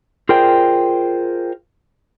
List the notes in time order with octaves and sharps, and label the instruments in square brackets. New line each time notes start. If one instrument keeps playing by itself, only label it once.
[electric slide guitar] F4 G#4 A#4 C5 D5 G5